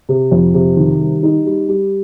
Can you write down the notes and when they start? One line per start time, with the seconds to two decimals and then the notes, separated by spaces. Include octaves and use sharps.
0.09 C3
0.32 F2
0.54 C3
0.77 D#3
1.00 G3
1.23 D#4
1.46 G3
1.68 G3